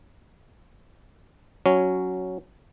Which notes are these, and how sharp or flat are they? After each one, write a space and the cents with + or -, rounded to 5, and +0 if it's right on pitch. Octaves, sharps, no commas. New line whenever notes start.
F#3 +0 C#4 +0